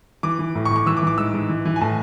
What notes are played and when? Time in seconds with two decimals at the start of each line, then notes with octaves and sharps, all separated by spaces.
0.23 E3 D6
0.39 E3
0.55 A2
0.65 C#6
0.70 A2
0.76 C#6
0.86 E3 E6
0.97 D6
1.02 E3
1.07 D6
1.18 G#2 E6
1.34 G#2
1.49 E3
1.65 E3
1.76 G#5
1.81 A2 A5